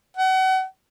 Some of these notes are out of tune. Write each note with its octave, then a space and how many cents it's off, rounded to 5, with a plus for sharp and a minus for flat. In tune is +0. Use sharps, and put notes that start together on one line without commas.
F#5 +35